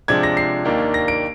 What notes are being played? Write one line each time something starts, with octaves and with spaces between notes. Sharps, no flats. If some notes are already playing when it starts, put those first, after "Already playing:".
C3 F3 G#3 D4 G#6
A#6
C7
D#2 D#3 A#3 D4
A#6
D7